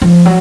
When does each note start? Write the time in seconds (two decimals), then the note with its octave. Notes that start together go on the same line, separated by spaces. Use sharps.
0.02 F3
0.25 F#3